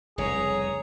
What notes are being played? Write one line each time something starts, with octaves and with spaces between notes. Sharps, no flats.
F1 C2 C#3 G#4 C#5 A#5